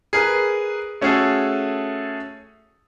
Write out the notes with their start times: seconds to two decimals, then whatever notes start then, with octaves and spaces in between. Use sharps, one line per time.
0.13 G#4 A#4 B4
1.01 A3 C#4 F#4 G#4 A4